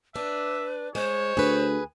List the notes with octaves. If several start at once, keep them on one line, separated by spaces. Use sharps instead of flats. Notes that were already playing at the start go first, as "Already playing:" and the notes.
D4 B4 E5
G#3 C5 C#5
D2 G#4 B4